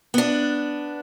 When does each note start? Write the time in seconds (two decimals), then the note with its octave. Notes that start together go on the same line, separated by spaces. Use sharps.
0.14 B3 D4